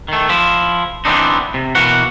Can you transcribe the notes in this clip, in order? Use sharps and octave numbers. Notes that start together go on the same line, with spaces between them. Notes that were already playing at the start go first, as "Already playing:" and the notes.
D#3 A3
F3 E4
E3 B3 C4 D4 D#4
C3
B2 E3 A#3 F#4 F#5